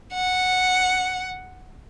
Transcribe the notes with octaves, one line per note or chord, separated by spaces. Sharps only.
F#5